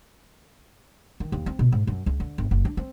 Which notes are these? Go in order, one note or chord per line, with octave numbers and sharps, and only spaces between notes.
D#3
D#2
C4
B2
G#2
F#2
C#2
D3
G1
F#1
D4
C4